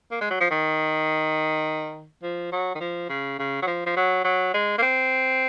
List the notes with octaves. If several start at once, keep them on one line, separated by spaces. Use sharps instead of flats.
A#3
G#3
F#3
F3
D#3
F3
F#3
D#3
F3
C#3
C#3
F#3
F3
F3
F#3
F#3
G#3
A#3
C4